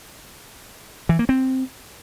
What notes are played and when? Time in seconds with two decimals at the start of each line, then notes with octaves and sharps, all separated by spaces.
1.09 E3
1.19 A#3
1.29 C4